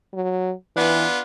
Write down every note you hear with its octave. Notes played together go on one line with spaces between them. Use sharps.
F#3
E3 B3 D4 F4